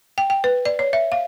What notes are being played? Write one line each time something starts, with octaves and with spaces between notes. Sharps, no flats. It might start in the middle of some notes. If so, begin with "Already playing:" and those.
G5
G5
B4
D5
C#5
E5
F5